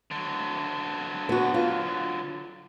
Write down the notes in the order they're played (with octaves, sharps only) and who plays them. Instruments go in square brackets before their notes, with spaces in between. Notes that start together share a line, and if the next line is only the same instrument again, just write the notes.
[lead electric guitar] D3 F#3
[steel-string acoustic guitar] B3 F#4
F4